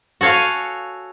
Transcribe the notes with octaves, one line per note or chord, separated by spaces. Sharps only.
F#4 A4 C#5 F5 G#5